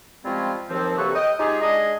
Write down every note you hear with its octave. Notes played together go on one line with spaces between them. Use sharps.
F3 G3 G#3 C4 C#4 F4
D#2 F3 C4
C3 F#3 A#3 A4 B4 C#6
D#5 G5
G#3 D#4 F4 G4 G#4
G#3 D4 G#4 D#5